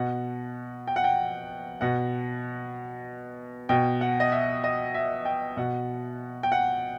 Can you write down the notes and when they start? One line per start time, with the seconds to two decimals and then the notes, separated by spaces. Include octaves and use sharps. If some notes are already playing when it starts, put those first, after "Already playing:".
Already playing: B2 F#5
0.87 G5
0.96 F#5
1.04 G5
1.81 B2 F#5
3.69 B2 G5
4.01 F#5
4.20 D#5
4.32 E5
4.64 D#5
4.94 E5
5.25 G5
5.57 B2 F#5
6.43 G5
6.52 F#5